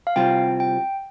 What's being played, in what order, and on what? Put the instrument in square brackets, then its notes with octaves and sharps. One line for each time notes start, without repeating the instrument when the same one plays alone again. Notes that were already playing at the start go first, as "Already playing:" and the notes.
[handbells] F5
[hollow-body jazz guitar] C2 C3 G3 C4 F4 [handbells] G5
[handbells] G5